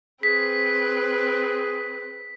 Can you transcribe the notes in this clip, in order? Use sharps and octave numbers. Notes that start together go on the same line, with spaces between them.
C4 G#4 B4 B6